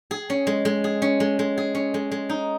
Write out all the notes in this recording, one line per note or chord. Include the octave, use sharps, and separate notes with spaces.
G#4
C#4
G#3
G#3
G#4
C#4
G#3
G#3
G#4
C#4
G#3
G#3
D#4